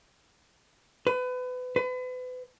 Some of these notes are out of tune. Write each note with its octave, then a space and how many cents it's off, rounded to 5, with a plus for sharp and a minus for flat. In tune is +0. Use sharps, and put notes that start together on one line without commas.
B4 +30
B4 +35